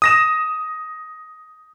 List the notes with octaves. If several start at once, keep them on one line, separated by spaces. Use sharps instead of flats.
D#6 A#6 E7